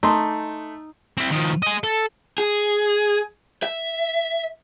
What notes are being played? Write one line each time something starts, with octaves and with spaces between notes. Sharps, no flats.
A3 D#4 C6
C4 E4
D#3 F3
G#4 D#5
A4
G#4
E5